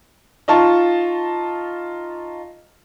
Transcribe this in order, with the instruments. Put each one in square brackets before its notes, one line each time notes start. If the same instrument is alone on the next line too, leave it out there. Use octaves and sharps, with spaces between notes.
[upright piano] D#4 F4 A5 C#6